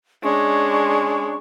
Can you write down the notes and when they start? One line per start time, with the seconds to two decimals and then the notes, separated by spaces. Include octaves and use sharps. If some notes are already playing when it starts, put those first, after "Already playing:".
0.23 G#3 C#4 D4 C#6